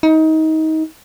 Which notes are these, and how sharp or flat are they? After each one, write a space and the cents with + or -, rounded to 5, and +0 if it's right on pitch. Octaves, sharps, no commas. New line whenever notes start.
D#4 +25